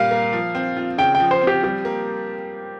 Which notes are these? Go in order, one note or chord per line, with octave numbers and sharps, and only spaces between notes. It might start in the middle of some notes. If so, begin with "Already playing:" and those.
Already playing: A#2 G3 A#3 F5
A#3
F3
C4
F4
C#3 G5
G5
F3
C5
C4
G4
G3 G4
A#3